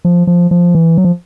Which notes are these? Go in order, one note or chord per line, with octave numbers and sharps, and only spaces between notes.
F3
F3
F3
E3
F#3
F3